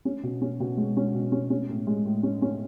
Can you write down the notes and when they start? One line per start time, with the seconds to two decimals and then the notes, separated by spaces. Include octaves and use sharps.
0.05 C#4
0.23 B2
0.42 C#4
0.60 B2
0.77 G#3
0.97 C#4
1.15 B2
1.32 C#4
1.50 C#4
1.69 A2
1.87 G#3
2.06 A2
2.23 C#4
2.42 C#4